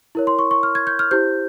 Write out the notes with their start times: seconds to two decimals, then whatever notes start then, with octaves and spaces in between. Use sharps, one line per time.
0.15 E4 A#4 C#5
0.27 C6
0.39 C#6
0.51 C#6
0.63 F6
0.75 G#6
0.87 G6
0.99 F6
1.11 E4 G4 C5 G6